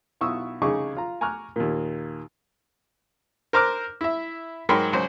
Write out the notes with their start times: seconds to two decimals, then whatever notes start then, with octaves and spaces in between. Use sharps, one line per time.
0.21 B1 E4 F4 C#6 D#6 E6
0.62 C2 C#3 D#4 G#4 C#6 D6
0.97 F4 A#5
1.21 G#5 A#5 C#6 D6 F6 F#6
1.56 D#2 A#2
3.53 A#4 C5 A#5 D6 F6 F#6
4.01 E4 E5
4.69 G#2 F#3 A#4 G5 B5 C6
4.93 C#2 F#3 C5